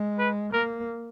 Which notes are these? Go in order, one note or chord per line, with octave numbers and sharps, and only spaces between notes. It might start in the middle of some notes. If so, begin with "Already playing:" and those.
Already playing: G#3
B4
A#3 A#4